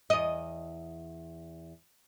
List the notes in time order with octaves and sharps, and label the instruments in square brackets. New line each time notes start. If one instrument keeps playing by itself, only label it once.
[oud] E2 D#5